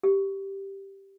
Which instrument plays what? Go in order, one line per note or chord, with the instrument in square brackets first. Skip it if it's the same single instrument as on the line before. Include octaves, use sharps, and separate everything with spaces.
[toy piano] G4